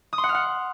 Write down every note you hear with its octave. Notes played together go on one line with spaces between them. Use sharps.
D#6
C6
F#5
F6
F#5